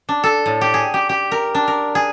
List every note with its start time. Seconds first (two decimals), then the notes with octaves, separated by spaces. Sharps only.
0.09 D4
0.24 A4
0.46 A2
0.61 G4
0.74 G#4
0.94 G4
1.09 G4
1.31 A#4
1.55 D4
1.68 A#4
1.95 G#4